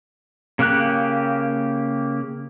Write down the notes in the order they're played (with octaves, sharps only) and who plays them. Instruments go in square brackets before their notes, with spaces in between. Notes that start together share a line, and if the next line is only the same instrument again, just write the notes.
[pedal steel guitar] C#3 A#3 G4 F#6